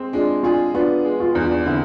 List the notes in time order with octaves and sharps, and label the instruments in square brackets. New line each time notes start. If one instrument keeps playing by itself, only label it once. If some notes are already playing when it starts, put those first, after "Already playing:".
Already playing: [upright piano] G#3 C4 G#4
[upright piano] G#3 [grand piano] D4 F4
[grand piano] D4 F4 [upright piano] G#4
[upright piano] B3 [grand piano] D4 F4
[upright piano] G#3
[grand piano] F4
[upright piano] E2 [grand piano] G#4
[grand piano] D4 F4
[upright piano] D3 [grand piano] C4 E4